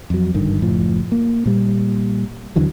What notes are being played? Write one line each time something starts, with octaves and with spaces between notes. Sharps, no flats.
F2 F#3
G#1 G2 D3 D#3
F#1 A2 F3
A#3
A#2 G3
D#2 D3 E3 F#3